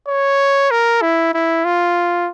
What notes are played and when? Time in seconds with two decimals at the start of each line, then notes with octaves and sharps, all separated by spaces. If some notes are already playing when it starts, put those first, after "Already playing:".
0.08 C#5
0.71 A#4
1.02 E4
1.34 E4
1.65 F4